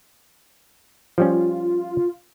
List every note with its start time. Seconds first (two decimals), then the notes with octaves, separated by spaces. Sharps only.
1.18 F3 G3 C#4 F4